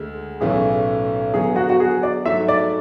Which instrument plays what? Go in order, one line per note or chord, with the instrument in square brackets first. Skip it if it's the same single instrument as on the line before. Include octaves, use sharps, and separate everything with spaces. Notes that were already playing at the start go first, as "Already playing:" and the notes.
Already playing: [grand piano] D2 D3 G#3
[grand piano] B1 A2 E3 A3 C#4 [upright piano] G#4
[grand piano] D3 F#3 B3 [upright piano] G#4
[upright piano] F#4
F#4
G#4
D5
[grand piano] G#2 F#3 A3 [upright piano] E5
[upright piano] D5